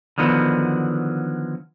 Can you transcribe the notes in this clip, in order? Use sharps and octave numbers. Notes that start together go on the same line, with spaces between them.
D3 D#3 F3 F#3 B3